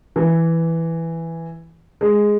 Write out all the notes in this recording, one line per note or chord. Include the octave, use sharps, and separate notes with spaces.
E3
G#3